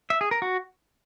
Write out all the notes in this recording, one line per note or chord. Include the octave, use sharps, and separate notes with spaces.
E5
G#4
A#4
F#4